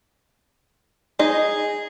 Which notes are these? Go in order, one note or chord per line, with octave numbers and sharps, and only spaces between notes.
D#4 G#4 D#5